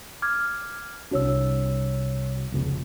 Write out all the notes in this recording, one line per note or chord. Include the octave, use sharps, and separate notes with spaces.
D6 F6 G#6
C2 D4 F#4 C#5 E6
F1 C#2 B2